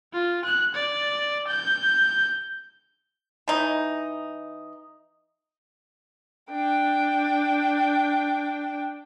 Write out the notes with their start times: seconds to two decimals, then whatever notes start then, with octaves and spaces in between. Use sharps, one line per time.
0.13 F4
0.45 F#6
0.75 D5
1.48 G6
3.48 E3 D#4
6.50 D4 G5